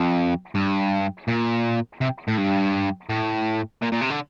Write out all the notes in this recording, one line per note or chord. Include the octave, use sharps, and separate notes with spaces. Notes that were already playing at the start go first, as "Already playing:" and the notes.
Already playing: F2
G2
A#2
C3
A2
G2
A2
A#2
A#2
C3
D3